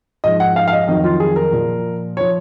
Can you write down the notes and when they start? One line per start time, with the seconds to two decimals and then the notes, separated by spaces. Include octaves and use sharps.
0.24 G#2 F3 D#5
0.40 F#5
0.56 F5
0.68 F5
0.73 D#5
0.88 F2 D#3 F#3 D#5
1.04 F4
1.20 G#4
1.36 A#4
1.52 A#2 F3
2.17 F3 C#5